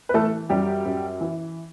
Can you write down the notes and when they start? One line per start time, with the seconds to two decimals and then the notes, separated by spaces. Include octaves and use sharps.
0.09 B4
0.14 E3 A3 A4
0.49 F#2 G3 G4
0.85 F#2
1.21 E3